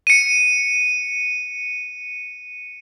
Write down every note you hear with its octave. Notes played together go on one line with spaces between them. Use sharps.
C#7 D#7